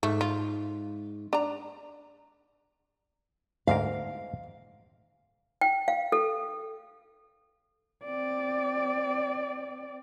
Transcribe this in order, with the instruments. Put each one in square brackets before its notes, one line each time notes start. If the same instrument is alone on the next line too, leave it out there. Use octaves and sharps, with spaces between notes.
[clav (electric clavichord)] G#2 [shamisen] A3
[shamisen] F4
D4 A#5
[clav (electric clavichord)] D2 G#2 A#4 [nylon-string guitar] F5
[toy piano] G5
F5
A4
[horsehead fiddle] C4 D5